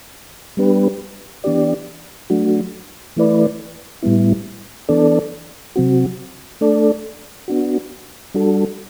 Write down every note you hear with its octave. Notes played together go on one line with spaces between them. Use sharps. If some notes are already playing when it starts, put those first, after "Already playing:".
G3 B3 D4 G4 B4
E3 B3 D4 G4 D5
F#3 A3 D4 F#4
E3 A3 E4 B4 D5
A2 G3 B3 E4
E3 B3 D4 A4 D5
C3 F#3 C4 F#4
A3 D4 A4 D5
B3 D4 F#4
G3 D4 F#4 A4